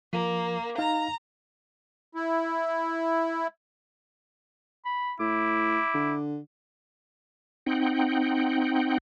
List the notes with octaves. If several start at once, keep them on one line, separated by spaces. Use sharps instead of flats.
F3 A#3
D#4 F5 A#5
E4
B5
A2 E4 D6
D3
C4 D#4 F#5 G5